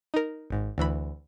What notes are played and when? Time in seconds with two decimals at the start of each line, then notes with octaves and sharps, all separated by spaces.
0.14 D#4 A#4
0.50 G#1 G#2
0.78 D2 E3 B5